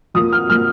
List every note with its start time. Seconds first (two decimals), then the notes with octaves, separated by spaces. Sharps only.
0.14 F2 F3 A#3 D#6
0.32 F6
0.50 F3 A#3 F6